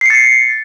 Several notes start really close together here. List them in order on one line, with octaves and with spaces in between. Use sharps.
C7 C#7 A6